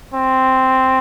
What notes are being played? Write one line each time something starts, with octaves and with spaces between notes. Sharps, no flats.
C4